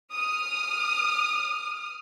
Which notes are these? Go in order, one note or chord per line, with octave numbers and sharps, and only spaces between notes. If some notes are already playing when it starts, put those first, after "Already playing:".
D#6 F6